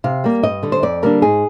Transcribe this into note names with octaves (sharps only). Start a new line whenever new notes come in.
C3 F5
G3 A#3
G2 D#5
D3 G3
C5
F2 D5
D3 G3 A#3 D4 A#4
G#2 G#4